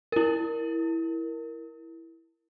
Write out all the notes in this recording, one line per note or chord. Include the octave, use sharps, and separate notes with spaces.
E4 A#4